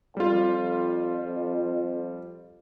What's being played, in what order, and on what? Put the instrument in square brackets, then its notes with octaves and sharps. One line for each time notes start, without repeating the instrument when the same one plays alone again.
[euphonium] F2 [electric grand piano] G3 F4